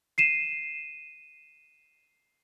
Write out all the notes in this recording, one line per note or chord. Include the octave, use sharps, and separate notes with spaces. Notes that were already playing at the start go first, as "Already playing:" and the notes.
C7 D#7 E7